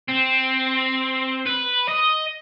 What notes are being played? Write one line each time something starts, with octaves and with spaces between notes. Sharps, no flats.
C4
B4
D#5